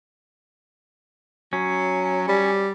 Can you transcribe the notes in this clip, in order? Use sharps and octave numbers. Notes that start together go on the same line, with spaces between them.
F#3 C#4
G3